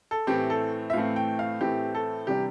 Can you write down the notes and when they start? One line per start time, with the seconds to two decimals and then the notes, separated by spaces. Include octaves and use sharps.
0.11 A4
0.27 A2 E3 A3 C4 G4
0.50 A4
0.90 E5
0.93 A2 E3 A3 C4 F5
1.16 G5
1.39 F5
1.61 A2 E3 A3 C4 G4
1.95 A4
2.27 C3 E3 G3 D4 G4